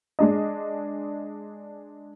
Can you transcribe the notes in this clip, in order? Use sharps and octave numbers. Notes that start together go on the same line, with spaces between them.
G#3 D4 D#5